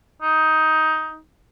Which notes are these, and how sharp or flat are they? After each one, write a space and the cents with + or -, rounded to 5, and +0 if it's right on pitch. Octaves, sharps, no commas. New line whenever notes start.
D#4 +15